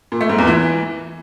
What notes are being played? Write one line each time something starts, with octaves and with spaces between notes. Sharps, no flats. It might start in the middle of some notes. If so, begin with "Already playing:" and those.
A#2
A3
G#2
E2
E3